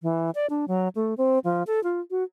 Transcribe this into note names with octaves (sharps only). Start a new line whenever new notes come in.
E3
D5
D4
F#3
A3
C4
F3
A4
F4
F#4